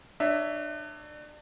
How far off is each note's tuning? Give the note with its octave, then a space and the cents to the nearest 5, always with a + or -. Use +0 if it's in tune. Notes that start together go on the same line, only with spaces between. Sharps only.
D4 +35 C#5 +30 E5 +0